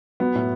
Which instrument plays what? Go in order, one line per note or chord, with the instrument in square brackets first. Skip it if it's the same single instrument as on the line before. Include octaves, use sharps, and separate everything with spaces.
[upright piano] F#3 B3
A2